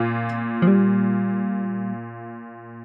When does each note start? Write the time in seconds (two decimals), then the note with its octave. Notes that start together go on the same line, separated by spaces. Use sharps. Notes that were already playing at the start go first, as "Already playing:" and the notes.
Already playing: A#2 A#3 F4
0.62 F3
0.67 G3